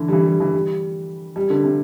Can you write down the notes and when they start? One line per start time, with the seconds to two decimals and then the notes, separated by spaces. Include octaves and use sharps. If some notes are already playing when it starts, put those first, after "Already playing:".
Already playing: D3 E3
0.08 G3
0.13 E3
0.26 G3
0.40 E3
0.53 G3
1.36 G3
1.50 D3
1.64 C3